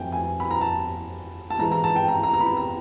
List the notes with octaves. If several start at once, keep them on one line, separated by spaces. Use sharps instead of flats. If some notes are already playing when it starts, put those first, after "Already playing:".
Already playing: F2 F#3 A3 C4 G5 G#5
G#5
B5
A#5
A5
A5
G#2 E3 G#3 A#5
A#5
A5
G5
A#5
A#5
A#5
B5
A#5